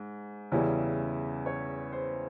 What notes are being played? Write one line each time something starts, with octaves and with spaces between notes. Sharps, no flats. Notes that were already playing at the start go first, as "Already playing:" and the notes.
Already playing: G#2
E2 C#3 G3 C#4 E4
C#5
C5